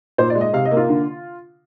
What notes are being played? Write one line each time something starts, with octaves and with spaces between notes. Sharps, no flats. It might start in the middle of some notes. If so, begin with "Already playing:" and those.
A#2 C5
D5
G#3
D#5
C3 F5
D#5
A#3
F4
D3